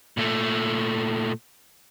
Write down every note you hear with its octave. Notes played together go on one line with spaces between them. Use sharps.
A#2 A3